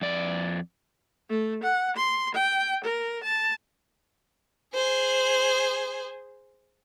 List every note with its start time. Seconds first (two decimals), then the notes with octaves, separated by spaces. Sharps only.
0.01 F2 D5
1.29 A3
1.63 F#5
1.96 C6
2.35 G5
2.84 A#4
3.23 A5
4.74 G#4 C5